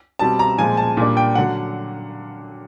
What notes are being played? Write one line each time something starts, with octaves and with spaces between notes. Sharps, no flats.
B2 G3 C4 A5
A#5
A#2 F3 G#3 G#5
A5
A#2 G3 A#3 D4
G5
D3 F#3 F#5